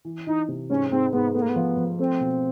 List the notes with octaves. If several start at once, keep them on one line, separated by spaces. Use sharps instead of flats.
E3
E3 D#4
C3
G#2 C#4
G#2 C4
G#2 B3
A3 B3
A#3
B3
F3
F3
A3 C4
B2